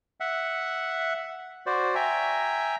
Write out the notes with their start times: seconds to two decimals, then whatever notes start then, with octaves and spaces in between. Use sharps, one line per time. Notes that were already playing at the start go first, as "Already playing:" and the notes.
0.20 E5 F#5
1.66 F#4 C5 D5
1.95 E5 G5 G#5 A#5